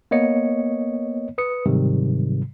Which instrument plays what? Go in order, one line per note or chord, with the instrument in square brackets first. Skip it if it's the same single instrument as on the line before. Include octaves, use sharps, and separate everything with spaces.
[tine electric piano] A#3 B3 C#5 D#5 C#7
B4 D#6 C#7
G#2 C3 D#3 F#3 G3